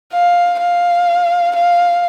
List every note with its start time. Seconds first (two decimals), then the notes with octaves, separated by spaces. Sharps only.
0.13 F5
0.60 F5
1.55 F5